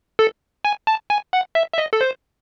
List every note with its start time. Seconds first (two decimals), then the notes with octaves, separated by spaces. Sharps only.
0.19 A4
0.65 G#5
0.87 A5
1.10 G#5
1.33 F#5
1.55 E5
1.74 E5
1.78 D#5
1.93 A4
2.01 C5